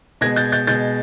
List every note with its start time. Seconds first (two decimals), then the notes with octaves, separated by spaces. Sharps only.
0.21 B2 G#3 G#6 A#6
0.36 G6 A6
0.52 G6 A6
0.67 B2 G#3 G6 A6